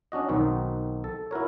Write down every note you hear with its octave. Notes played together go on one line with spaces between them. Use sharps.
C#4 D4 F#4 D#5
B1 D#3 C4 D#4 F#4
A4
E4 F#4 A#4 C#5